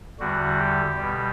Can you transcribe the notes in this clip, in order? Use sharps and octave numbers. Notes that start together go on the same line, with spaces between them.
E2 D3 G3 F#4
G4
B2 G3